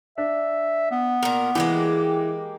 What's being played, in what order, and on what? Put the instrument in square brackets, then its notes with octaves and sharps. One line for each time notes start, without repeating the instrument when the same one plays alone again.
[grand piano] D4 [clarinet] E5
[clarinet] B3
[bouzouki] A#2 A#4
[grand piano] E3 [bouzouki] G#3 A#3 G4